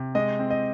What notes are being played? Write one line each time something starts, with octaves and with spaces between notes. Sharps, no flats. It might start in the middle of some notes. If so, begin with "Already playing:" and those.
Already playing: C3
G#3 D#5
C4
D#5